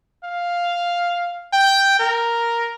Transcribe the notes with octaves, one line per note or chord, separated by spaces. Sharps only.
F5
G5
A#4